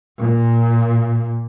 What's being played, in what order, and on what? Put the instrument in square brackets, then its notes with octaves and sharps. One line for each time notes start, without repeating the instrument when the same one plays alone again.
[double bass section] A#2